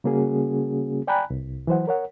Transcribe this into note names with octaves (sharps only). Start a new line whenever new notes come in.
C#3 G3 A#3 C#4 F#4 G#4
D5 G5 G#5 A#5 B5 F#6
C2
E3 F#3 C5 F#5
A#4 C#5 F#5